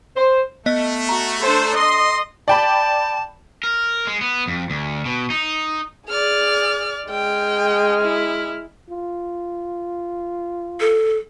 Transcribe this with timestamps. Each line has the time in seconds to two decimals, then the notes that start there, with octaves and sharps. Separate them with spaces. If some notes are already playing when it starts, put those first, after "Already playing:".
0.16 C5
0.66 A3 B3 D#5
1.09 F#4 A#5
1.44 D4 A4 C5
1.76 D#5 C6
2.48 D5 G5 A5 B5
3.64 A#4
4.07 G#3
4.21 B3
4.47 F2
4.70 D2
5.05 B2
5.30 D#4
6.09 G#4 D5 F6
7.10 G#3 G5 F6
8.01 E4
8.90 F4
10.80 A4